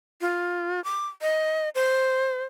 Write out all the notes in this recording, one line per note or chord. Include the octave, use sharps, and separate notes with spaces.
F4
D6
D#5
C5